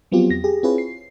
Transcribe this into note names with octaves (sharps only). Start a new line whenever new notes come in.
F3 F#3 B3 C4 F4 G4
E2 A#6
G4 G#4
C4 E4 F4 G#4 B4 C#5
C7